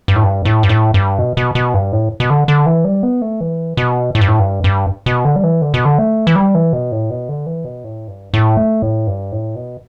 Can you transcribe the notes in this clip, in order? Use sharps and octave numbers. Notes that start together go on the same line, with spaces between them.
G2
A2
G2
A2
G2
A2
G2
B2
B2
B2
G2
A2
B2
D3
D3
E3
G3
B3
A3
E3
B2
A2
G2
A2
G2
G2
B2
D3
G3
E3
D3
B2
D3
A3
E3
G3
E3
B2
A2
B2
D3
E3
B2
A2
G2
A2
A3
A2
G2
A2
B2